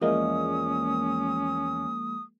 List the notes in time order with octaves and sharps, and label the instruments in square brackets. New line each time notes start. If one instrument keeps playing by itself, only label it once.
[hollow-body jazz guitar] E2 D#5 [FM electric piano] F3 G#3 A#3 [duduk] C#4 [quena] D#6